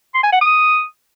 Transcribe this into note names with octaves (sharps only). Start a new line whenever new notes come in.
C6
G#5
F#5
D#6